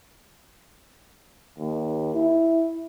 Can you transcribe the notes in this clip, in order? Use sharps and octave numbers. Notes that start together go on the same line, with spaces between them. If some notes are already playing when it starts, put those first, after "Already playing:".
D#2
E4